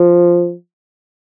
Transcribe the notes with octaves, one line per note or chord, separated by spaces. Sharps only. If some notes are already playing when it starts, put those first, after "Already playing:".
Already playing: F3